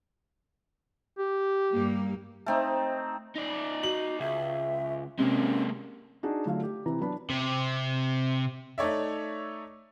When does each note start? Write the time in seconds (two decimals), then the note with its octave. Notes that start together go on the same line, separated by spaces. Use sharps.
1.19 G4
1.72 G2 G3 A#3
2.46 A3 C4 D#4
3.36 D#4 D5
3.83 F#4 F#7
4.20 C#2 E5
5.19 C3 G#3 A#3 C#4
6.23 D4 D#4 F#4 G#4
6.46 D3 F#3 A3 F4 F#4 F5
6.63 G4
6.86 C3 E3 A#5
7.01 F#3 B3 D4 B5
7.30 C3
8.78 A3 D#4 C#5 D5 E5